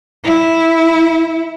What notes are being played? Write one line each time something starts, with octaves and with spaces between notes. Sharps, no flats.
E4